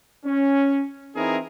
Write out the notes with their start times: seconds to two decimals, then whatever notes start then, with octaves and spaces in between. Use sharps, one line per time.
0.25 C#4
1.16 E3 C4 D#4 E4 G#4 A#4